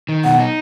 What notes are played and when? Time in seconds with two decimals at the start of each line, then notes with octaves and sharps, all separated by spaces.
0.09 D#3
0.24 B2 F#5
0.39 D#4